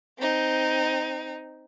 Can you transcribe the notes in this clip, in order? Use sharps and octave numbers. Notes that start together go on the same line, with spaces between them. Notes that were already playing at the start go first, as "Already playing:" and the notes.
C4 D#4